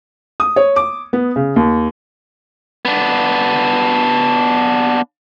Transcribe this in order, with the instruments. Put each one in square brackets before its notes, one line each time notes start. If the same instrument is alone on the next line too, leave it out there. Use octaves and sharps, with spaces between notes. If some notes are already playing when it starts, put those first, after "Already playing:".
[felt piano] D#6
C#5
D6
B3
C#3
D#2
[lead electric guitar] B3 D4